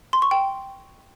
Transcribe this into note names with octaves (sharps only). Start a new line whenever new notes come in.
C6
C#6
G5